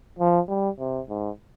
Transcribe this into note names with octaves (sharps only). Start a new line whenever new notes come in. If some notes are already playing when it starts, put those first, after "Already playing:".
F3
G3
C3
G#2